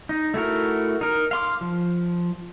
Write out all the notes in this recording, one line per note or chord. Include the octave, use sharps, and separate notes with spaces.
D#4
A3 E4 F#4 A#4
D#4 A#4
F5 C6 D6
F3